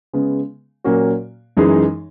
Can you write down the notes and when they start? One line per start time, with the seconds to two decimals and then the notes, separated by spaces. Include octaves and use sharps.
0.13 C#3 G#3 B3
0.84 A#2 F#3 A#3 C#4 F#4
1.57 F#2 E3 G#3 D#4 G#4